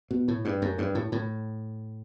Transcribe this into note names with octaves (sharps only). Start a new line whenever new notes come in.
B2
A2
G2
F#2
G2
A2
A2